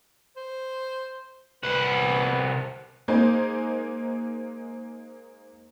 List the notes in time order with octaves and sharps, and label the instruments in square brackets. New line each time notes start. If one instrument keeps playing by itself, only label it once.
[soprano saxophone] C5
[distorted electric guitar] C2 F#5 [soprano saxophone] B4
[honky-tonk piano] G#3 A#3 D#4 G#4 C5